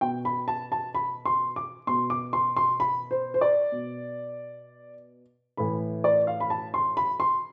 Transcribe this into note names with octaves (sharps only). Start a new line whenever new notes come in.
B2 G5
B5
A5
A5
B5
C6
D6
B2 C6
D6
C6
C6
B5
C5
C5
D5
B2
A2 E3 B5
D5
F5
B5
A5
C6
B5
C6